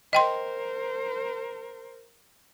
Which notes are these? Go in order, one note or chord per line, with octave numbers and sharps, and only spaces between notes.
A#4 C5 D#5 G5 C6